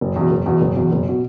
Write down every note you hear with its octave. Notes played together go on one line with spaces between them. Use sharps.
F#1
E2 B2
F#1
E2 B2
F#1
E2 B2
F#1
B2